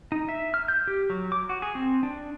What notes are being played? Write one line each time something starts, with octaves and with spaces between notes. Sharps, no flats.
D#4
E5
F6
G6
G4
F#3
D6
F#4
G#4
C4
D4